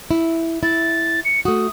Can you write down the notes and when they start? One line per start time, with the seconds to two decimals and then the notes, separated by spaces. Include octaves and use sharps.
0.11 E4
0.63 E4 A6
1.24 C#7
1.45 A3 F#4 D#6